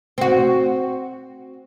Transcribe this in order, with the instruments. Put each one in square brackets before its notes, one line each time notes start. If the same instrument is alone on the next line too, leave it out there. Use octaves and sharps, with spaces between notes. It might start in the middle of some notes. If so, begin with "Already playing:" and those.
[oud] C4 F#4